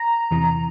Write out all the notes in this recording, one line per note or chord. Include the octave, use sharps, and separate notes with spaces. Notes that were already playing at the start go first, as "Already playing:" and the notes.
Already playing: A#5
E2 C3 E3